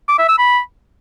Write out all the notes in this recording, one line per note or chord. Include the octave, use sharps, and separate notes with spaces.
D6
E5
E6
B5